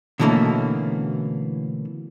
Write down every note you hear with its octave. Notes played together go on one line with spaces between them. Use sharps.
B2 D3 E3 A3 A#3 C#4